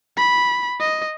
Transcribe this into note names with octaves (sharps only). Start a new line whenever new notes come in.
B5
D#5